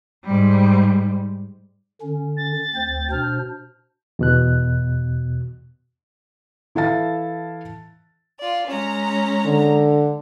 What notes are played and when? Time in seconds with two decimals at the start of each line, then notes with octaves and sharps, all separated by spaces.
0.25 G#2 G3
2.02 D3 C#4
2.37 A6
2.75 D2 C4 C5
3.11 B2 D4 C5 F6
4.19 E2 B2 F#6
6.75 E3 E4 A4 F5 A5 A6
8.39 F4 D5
8.68 G#3 C#4 A#5
9.45 D3